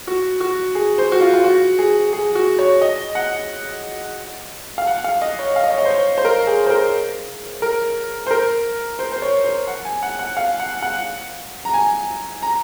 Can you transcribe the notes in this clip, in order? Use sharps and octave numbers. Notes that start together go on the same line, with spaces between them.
F#4
F#4
G#4
C5
F#4
F4
F4
F#4
G#4
G#4
F#4
C#5
D#5
F#5
F5
F#5
F5
D#5
C#5
F5
D#5
C#5
D#5
C5
C#5
C5
A#4
G#4
C5
A#4
A#4
C5
A#4
C5
C5
C#5
C5
F#5
G#5
F#5
F#5
F5
F#5
F#5
A#5
G#5
A#5